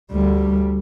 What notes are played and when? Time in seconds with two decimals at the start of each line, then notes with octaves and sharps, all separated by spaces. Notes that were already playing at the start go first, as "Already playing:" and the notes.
0.11 D2 G3